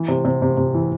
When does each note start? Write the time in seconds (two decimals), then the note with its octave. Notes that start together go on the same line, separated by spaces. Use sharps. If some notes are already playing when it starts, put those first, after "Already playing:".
Already playing: E3
0.08 C3
0.25 C3
0.42 C3
0.57 C3
0.74 E3